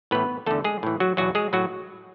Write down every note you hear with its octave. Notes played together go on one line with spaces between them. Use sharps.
A2 E3 B3 B4
E2 D3 A3 A4
G#3 G#4
A2 E3
F#3 F#4
E2 B2 F#3 F#4
G#3 G#4
A2 F#3 F#4